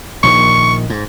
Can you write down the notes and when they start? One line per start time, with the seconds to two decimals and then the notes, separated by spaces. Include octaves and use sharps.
0.23 A#1 A#2 D#3 C#6
0.90 G#2